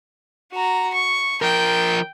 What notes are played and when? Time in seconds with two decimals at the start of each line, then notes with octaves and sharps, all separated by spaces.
0.52 F#4 A#5
0.94 C#6
1.42 F3 A#4 G5